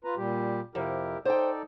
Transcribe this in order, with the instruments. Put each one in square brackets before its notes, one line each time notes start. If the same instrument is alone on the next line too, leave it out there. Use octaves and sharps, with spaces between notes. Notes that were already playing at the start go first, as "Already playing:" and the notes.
[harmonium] F4 B4 A#5
A#2 G3 G4
[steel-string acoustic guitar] F2 C3 [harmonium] E4 G4 A#4
[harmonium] D#4 A4 D5 [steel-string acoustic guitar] C5 G5